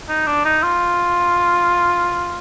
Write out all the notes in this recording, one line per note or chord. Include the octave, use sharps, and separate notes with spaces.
D#4
D4
D#4
F4